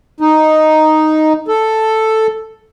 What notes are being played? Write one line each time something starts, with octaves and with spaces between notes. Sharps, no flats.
D#4
A4